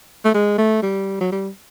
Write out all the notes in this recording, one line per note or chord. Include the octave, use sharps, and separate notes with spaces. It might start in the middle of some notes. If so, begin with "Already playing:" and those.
A3
G#3
A3
G3
F#3
G3